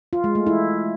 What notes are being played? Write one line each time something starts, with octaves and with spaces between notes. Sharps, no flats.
F4
G#3
A3
E4